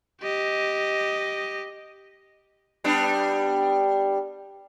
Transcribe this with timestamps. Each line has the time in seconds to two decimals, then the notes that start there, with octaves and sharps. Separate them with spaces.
0.21 G4 D#5
2.84 G3 B3 D4